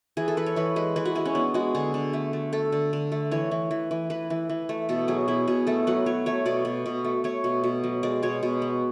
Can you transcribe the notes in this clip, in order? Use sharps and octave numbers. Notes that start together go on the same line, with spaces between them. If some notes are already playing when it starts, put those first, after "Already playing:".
E3 G#4
A4
E3 B4
C#5
E3 B4
G#3 B4
E3 B4
F#4
G#3 E4
C#4
B3 D4
G#3 F#4
D3 G#4
D3
A3
A3
A3 A4
D3
D3
A3
E3 C#5
E3
E3
E3
E3 B4
E3
E3
A3
B2 A4
F#3 G#4
B2 E4
B2 G#4
A3 A4
F#3 B4
F#3 C#5
A3 C#5
B2 D5
B2
B2
A3
A3 C#5
B2
B2
F#3
G#3 D5
B2 C#5
B2
B3